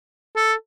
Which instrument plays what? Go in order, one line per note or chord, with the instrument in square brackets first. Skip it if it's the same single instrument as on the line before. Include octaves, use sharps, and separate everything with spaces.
[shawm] A4